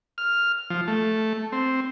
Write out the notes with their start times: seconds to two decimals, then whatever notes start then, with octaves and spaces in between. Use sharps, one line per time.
0.18 F6
0.70 F3
0.88 A3
1.52 C4